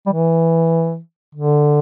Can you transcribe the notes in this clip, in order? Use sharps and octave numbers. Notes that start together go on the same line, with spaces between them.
G3
E3
D3